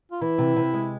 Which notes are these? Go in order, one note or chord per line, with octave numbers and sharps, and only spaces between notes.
F4
E3 E4
C3
C3
G#3